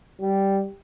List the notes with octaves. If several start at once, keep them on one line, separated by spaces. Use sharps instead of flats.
G3